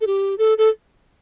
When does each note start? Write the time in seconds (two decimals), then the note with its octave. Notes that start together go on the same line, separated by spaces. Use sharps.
0.01 A4
0.07 G4
0.38 A4
0.58 A4